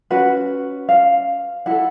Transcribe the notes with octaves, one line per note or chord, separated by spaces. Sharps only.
C#4 F#4 B4 F#5
F5
E4 A4 F#5